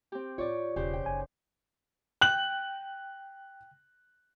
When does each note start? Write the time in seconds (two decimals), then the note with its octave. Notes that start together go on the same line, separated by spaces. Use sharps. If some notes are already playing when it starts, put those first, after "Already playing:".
0.12 C4 G4
0.38 A2 E4 F4 C#5 D5
0.76 E1 C#3 G4 C5
0.93 G5
1.06 F#1 D#4 G#5
2.21 G5 F#6 F#7